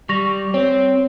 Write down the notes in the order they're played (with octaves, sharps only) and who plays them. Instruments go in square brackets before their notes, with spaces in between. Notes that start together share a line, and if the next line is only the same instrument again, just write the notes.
[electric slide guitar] G3 [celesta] C#6 A#6 F7
[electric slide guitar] C4 [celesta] C#5